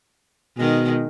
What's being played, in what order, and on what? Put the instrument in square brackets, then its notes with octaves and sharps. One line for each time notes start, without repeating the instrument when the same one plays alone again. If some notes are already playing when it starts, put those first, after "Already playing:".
[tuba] B2 [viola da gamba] D#3 G#3